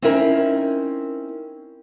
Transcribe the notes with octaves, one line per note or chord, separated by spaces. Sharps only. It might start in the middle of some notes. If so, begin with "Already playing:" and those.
C4 C#4 D#4 E4 A#4